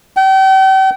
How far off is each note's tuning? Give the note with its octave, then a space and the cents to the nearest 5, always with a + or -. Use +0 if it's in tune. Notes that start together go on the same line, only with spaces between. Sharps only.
G5 -40